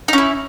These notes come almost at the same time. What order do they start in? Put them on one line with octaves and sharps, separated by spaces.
D#4 C#4 E4